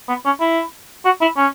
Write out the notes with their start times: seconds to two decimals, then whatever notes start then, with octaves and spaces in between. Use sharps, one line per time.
0.09 B3
0.25 C#4
0.40 E4
1.05 F#4
1.21 E4
1.37 C#4